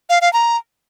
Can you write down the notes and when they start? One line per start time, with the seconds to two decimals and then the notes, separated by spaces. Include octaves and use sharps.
0.10 F5
0.21 F5
0.33 A#5